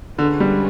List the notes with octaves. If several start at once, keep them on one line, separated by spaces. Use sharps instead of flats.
D3 G#3 C#4 F4 G#4 B4
G3